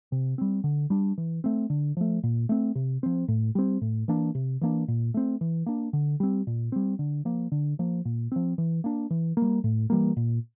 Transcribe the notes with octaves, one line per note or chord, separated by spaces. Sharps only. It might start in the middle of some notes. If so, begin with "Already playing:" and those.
C3
G3 C4
D3
G3 D4
E3
A3 C4
D3
F3 A3
A#2
A3 C4
C3
F3 C4
A2
G3 C4
A2
E3 A#3 D4
C3
E3 A#3 D4
A#2
A3 C4
E3
A#3 D4
D3
G3 C4
A#2
G3 C4
D3
F3 A#3
D3
F3 A#3
A#2
F3 C4
E3
A#3 D4
E3
A#3
G3
A2
E3 G3 A#3
A#2